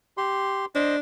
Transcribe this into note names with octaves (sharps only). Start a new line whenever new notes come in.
G4 C6
D4 C5 D#5